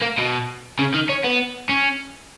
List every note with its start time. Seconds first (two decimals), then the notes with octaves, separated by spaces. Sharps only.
0.02 A#3
0.18 B2
0.79 C#3
0.94 D#3
1.09 C#4
1.24 B3
1.69 C#4